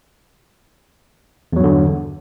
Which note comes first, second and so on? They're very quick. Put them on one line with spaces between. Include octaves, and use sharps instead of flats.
E2 F#3 G2 D3